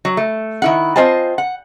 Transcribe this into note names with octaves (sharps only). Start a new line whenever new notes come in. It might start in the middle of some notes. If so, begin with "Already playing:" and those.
F#3
A3
D#3 E4 F#5
C4 F4 C5 D#5 G#5 A5
F#5